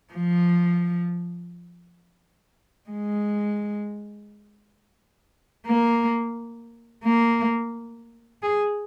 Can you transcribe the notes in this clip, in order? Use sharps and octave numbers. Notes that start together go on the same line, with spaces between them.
F3
G#3
A#3
A#3
G#4